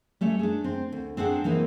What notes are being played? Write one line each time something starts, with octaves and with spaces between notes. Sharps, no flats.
G3 A3 C#4
D4 G#4
C4
D2
C4 D4 G#4 F#5
E3 A#3 C4 D#4